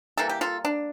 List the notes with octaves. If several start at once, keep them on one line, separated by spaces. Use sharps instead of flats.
E3 G3 A#3 A4
G4
F4 A4
D4